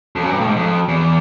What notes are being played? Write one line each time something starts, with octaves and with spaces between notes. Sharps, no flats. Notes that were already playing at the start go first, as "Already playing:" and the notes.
F2
F#2
G2
A2
G#2
F2
E2